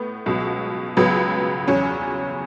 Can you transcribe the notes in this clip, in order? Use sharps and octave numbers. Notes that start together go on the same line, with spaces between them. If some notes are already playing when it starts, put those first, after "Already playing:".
Already playing: A2 B3
C#2 B2 F#3
C#2 C#3 F#3 B3
E2 C#3 F#3 C#4